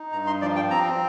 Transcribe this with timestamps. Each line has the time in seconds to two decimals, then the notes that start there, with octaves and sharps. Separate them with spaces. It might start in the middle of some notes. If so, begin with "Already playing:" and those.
Already playing: D#4
0.12 G2 A#5
0.27 C6
0.41 F3 D5
0.56 G5
0.71 C4 A#5